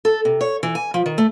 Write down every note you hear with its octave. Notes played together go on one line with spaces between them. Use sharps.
A4
C3
C#5
E3
G#5
F3
D#3
A3